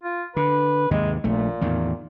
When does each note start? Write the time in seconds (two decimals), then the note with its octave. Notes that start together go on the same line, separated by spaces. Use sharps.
0.04 F4
0.36 D3 B4
0.91 D#2 G#2 C3 G#3
1.24 A#1 A#2 A3
1.61 E2 A2 D#3